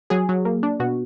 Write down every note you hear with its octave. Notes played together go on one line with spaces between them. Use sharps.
F#3 G#4
F#3
A#3
D4
B2 F#4